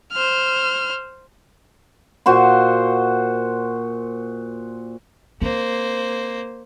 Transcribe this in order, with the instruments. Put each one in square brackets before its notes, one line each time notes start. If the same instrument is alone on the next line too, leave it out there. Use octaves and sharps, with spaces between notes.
[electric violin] C5 F6
[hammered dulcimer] A#2 F#4 C5 C6
[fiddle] A#3 C5 [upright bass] C4